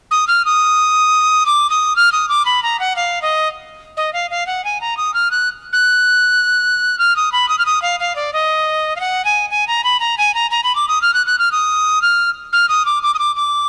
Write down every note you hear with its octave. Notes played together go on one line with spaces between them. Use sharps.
D#6
F6
D#6
D6
D#6
F6
D#6
D6
B5
A#5
F#5
F5
D#5
D#5
F5
F5
F#5
G#5
A#5
D#6
F6
F#6
F#6
F6
D#6
B5
D#6
F6
D#6
F5
F5
D5
D#5
F5
F#5
G#5
G#5
A#5
B5
A#5
G#5
A#5
A#5
B5
D6
D#6
F6
F#6
F#6
F6
D#6
F6
F6
D#6
D6
D6
D#6
D6
D6